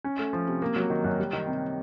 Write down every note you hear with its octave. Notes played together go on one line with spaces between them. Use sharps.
C#4
A3
F3
C3
A#3
F#3
D#3
F#2
G3
D#3
C3